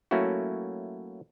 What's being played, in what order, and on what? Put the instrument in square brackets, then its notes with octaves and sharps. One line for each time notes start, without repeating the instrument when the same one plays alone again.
[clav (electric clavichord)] F#3 A3 A#3 C#4 E4 F#4